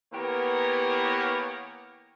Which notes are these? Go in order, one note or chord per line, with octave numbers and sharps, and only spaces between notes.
E3 A#3 B3 G4 A#4 C#5